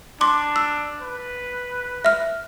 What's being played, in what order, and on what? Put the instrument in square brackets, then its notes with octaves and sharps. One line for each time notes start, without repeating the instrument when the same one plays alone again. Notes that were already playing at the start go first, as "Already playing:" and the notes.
[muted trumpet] D4 [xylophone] C6 D6
[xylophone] E6
[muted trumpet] B4
[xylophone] E5 F6